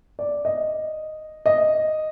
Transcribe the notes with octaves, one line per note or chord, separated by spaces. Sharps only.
D5
D#5
D#5